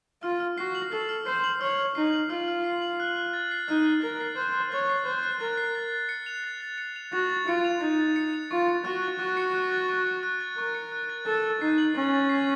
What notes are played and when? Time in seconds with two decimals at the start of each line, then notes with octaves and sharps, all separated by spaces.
0.23 F4 F6
0.40 F6
0.58 F#4 C7
0.75 F#7
0.92 A4 F6
1.09 F6
1.26 C5 C7
1.44 F#7
1.61 C#5 F6
1.78 F6
1.95 D#4 C7
2.13 F#7
2.30 F4 F6
2.48 F6
2.64 C7
2.82 F#7
3.00 F#6
3.17 F#6
3.33 A6
3.51 C7
3.68 D#4 F#6
3.86 F#6
4.02 A#4 A6
4.20 C7
4.36 C5 F#6
4.54 F#6
4.72 C#5 A6
4.89 C7
5.05 C5 F#6
5.23 F#6
5.40 A#4 A6
5.57 C7
5.75 A6
5.92 A6
6.09 C#7
6.26 F7
6.44 A6
6.61 A6
6.78 C#7
6.96 F7
7.13 F#4 A6
7.30 A6
7.47 F4 C#7
7.64 F7
7.81 D#4 A6
7.99 A6
8.16 C#7
8.33 F7
8.51 F4 C#6
8.68 C#7
8.85 F#4 F#6
9.02 A6
9.20 F#4 C#6
9.37 C#7
9.55 F#6
9.71 A6
9.89 C#6
10.06 C#7
10.23 F#6
10.41 A6
10.58 A#4 C#6
10.75 C#7
10.92 F#6
11.10 A6
11.26 A4 A6
11.43 A6
11.61 D#4 C7
11.78 F#7
11.96 C#4 A6
12.13 A6
12.29 C7